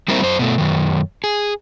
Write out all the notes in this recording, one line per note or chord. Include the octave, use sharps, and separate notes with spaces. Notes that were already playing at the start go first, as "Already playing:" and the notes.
G3 A#3 C4 E4 A#4 C5
F#2 C5
B2 A3
F#2 D#3
G#4